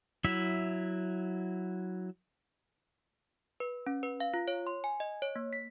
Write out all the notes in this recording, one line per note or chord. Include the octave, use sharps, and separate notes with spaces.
F#3 E4 E5
B4
C#4
B4
F5
F4
C#5
C6
G#5
D#5
C#5
A#3
B6